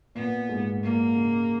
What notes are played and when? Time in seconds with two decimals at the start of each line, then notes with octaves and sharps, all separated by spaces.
0.15 A#2 B3
0.49 G#2
0.82 A#2 A#3
1.16 C#3